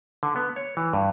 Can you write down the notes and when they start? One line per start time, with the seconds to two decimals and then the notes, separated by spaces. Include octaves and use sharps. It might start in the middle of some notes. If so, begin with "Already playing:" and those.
0.23 D3
0.36 B3
0.56 C#5
0.77 E3
0.93 G2